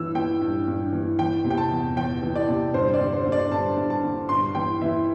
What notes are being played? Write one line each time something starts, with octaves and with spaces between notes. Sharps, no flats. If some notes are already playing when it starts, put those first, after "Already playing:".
Already playing: G2 E3 E6
E3 G5
G2
G2
E3
E3 G5
C3
G5
A5
E2
E2 G5
E3
D5
C3
G2 C5
D5
D3
C5
D3
D5
G2 A5
G2
A5
D3
G2 C6
E3 G5
E3 E5